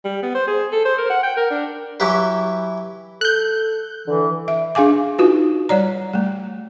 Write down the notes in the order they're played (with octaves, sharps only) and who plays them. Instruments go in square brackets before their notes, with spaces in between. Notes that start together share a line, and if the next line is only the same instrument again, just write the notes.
[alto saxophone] G3
B3
C5
G#4
A4
C5
A#4
F#5
G5
A#4
D4
[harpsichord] E3 F#3 E4 G4 B4
[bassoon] A4 [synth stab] F#6 G6
[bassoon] D3 [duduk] E3
[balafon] E5
D4 G#4 F5 G#5 D6
D#4 F4 F#4 B4
G3 C#5 D5 A#5
G3 A3